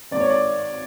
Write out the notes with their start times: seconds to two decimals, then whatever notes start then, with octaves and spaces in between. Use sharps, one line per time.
0.11 G#1 G#2 D#3 D5
0.20 C#5
0.30 D5